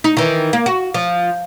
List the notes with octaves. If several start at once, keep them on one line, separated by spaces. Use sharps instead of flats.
D#4
D#3 E3
A#3
F#4
F3